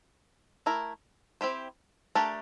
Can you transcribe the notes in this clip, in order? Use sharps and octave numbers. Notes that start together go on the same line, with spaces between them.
A3 E4 A#4
C4 E4 G4 C5
A3 D4 G4 A#4 D5